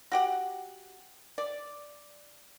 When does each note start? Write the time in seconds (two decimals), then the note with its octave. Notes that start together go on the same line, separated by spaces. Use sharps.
0.12 F#4 G4 F#5
1.38 D5